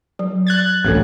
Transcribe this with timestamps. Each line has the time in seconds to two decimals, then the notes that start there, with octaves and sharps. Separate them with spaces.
0.19 F#3
0.47 F#6 G#6 A6
0.85 A1 D2 A#3 A4